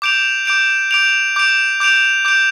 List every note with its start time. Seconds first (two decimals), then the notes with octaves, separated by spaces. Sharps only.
0.02 D6 G6 D7 F7
0.46 D6 G6 D7 F7
0.91 D6 G6 D7 F7
1.36 D6 G6 D7 F7
1.80 D6 G6 D7 F7
2.25 D6 G6 D7 F7